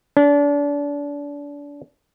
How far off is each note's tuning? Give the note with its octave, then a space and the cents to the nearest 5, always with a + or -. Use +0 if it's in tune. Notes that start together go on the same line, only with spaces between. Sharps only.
D4 -30